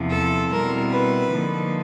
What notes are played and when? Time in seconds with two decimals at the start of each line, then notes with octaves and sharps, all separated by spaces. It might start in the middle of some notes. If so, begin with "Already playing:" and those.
Already playing: E2 C3 F3
0.10 A4
0.50 B2 G3 C4 E4 A#4
0.91 B4
1.31 D3 F3 A#3 D#4